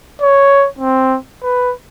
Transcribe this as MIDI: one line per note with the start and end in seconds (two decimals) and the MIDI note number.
0.21 0.67 73
0.79 1.17 60
1.43 1.72 71